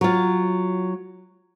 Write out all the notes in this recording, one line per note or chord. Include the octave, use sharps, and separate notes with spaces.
F#3 F4